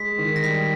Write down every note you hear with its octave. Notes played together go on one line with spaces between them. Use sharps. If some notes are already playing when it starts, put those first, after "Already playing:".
Already playing: G#3 B6
D#3
A#6
G3 B6